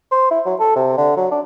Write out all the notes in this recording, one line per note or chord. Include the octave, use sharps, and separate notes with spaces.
C5
E4
F#3
A4
C3
D3
F#3
D4